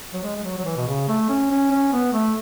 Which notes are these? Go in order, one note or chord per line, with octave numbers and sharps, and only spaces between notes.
F#3
G#3
G#3
F#3
F#3
E3
B2
C#3
A3
C#4
C#4
C#4
B3
A3